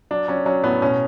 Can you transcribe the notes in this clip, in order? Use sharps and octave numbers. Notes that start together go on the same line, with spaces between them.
F#3 D4
F#3 C#4
F#3 C#4
A2 B3
B2 C#4